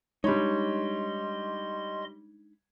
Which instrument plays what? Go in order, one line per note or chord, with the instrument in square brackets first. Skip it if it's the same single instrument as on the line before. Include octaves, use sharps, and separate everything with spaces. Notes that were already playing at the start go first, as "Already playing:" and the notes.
[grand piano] G3 C#5 [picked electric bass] G#3 D4 [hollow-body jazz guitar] D#4 B5 [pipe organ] D#5 C6